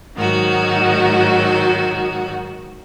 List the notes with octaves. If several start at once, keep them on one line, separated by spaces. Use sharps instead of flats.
G#2 D#3 F#3 F#4